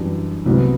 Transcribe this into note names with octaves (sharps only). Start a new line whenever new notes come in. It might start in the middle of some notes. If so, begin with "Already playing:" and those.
Already playing: F#2 E3 G3 D4
C2 C3 F#3 B3